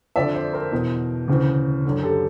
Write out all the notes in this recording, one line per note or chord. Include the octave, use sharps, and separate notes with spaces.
F2 D3 D5 E5
C5 D5
A#4 C5
E2 B2
D2 C#3 E3
F#2 D3
G4 A4